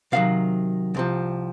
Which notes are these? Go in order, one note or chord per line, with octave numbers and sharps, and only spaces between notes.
C3 D#3 F#3 F5
C2 C3 F3